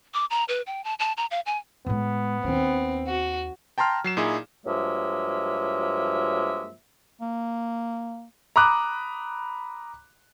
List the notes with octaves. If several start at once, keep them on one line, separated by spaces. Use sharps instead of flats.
D6
A#5
B4
G5
A5
A5
A#5
F5
G#5
A2 G#3 B3
D#2 C4 D4
F#4
G5 A5 A#5 C6 F6
F#3 C7 E7
A#2 D#4 E4 G#4
G2 F3 F#3 G#3 A#3 E5
A#3
A#5 B5 D6 D#6 F#6